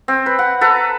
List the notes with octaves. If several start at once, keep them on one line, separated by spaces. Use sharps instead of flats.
C4
B4
F#5
A4 B4 A#5